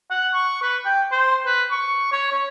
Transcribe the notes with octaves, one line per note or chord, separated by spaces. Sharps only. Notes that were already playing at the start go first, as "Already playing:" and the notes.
F#5
C#6
B4
G5
C5
B4
C#6
C#5
C#5